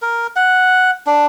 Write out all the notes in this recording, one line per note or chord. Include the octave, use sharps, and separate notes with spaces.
A#4
F#5
D4